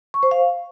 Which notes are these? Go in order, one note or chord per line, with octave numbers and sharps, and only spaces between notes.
C#6
C5
F5